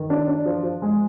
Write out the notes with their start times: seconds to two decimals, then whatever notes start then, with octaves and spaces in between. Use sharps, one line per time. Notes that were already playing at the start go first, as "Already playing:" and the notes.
Already playing: D#3
0.10 D4
0.28 D4
0.46 F3
0.63 F3
0.82 G#3